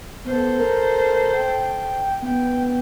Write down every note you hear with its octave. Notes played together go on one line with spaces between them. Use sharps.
B3 A4 C5
A#4
G5
B3 G5